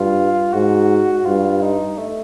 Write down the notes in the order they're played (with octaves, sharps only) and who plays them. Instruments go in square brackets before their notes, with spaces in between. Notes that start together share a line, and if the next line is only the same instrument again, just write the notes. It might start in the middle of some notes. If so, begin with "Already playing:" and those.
Already playing: [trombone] G2 [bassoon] F4
[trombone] G#2 [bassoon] F#4
[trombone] G2 [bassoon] F4
[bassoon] D#4
A3